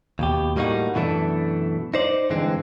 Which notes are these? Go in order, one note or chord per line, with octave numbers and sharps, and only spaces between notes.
D#2 B2 G4
A2 G3 A#3 D#4 F#4
F#2 B2 E3 A3 D4
D#4 C5 D5
G2 D3 E3 G#3 C4